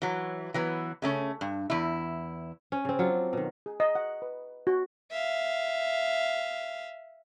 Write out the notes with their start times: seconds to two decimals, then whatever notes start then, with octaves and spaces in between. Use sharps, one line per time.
0.02 E3 F#3
0.54 E3 F#3 B3
1.02 C#3 A3 C#4
1.41 G2
1.70 E2 E4
2.72 C#4
2.85 C#3 C4
2.99 F#3 D4 F4
3.33 B2 D#3
3.66 G#4
3.80 D#5
3.95 F#5
4.22 B4
4.67 F#4
5.11 E5 F5